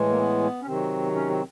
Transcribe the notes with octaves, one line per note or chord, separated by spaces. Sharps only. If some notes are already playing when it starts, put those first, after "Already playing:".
Already playing: A2 E3 G#3
A#3
B3
C#4
C3 D#3 F#3 C4
C#4
C4